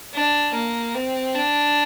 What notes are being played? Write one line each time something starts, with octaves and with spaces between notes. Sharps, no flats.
D4
A#3
C4
D4